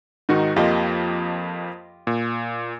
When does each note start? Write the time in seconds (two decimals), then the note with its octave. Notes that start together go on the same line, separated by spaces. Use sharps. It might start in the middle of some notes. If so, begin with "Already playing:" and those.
0.29 G#2 D#3 D#4 F#4
0.56 F2 F3 A#3 F4 G4 D#5
2.07 A#2